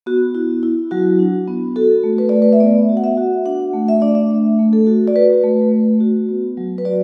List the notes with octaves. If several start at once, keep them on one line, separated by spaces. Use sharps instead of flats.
B3 F#4
E4
E4
F#3 F#4
D4
B3
F#4 A4
A3
B4
A3 D5
B4
E5
B3 D5
F#4
F#5
E5
F#4
D4 F#5
A3
E5
D4 D5
E5
A3
A3
A4
F#4
D5
F#4 B4
A3
A3
F#4
B3
F#3
B4
F#4 D5